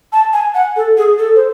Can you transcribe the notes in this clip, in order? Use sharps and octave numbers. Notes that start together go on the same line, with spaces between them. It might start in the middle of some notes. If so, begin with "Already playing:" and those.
A5
G#5
F#5
A4
G#4
A4
C5